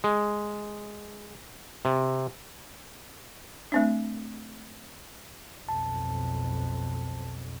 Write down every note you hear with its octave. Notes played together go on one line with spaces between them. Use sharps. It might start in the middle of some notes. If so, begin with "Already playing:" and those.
G#3
C3
A3 C4 D4
B1 F2 A5